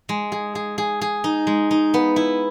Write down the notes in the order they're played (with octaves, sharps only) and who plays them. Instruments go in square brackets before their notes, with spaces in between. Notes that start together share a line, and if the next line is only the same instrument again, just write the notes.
[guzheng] G#3
G#4
G#4
G#4
G#4
D#4
G#3
D#4
B3
E4